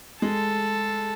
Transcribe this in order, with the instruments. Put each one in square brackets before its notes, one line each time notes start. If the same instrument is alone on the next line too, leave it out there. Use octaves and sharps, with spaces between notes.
[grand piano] G#3 [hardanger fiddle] A4